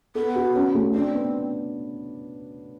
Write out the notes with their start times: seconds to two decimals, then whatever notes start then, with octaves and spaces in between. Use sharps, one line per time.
0.15 B3 A4
0.36 F#4
0.56 C#4
0.75 A3
0.94 C4 D4
1.14 B3